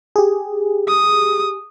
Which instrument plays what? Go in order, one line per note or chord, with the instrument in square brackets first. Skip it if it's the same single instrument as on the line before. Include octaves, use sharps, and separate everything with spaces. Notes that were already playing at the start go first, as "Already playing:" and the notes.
[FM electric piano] G4 G#4
[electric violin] D#6